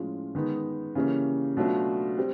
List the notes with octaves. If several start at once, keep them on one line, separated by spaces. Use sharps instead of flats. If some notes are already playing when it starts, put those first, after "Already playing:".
Already playing: A2 F3 G#3 C#4 F4
D#3 G#3 B3 D#4
C#3 E3 G3 A#3 C#4
B2 F#3 A3 D4 F4
G3 C4